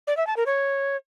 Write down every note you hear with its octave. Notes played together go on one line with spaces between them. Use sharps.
D5
E5
A5
A#4
C#5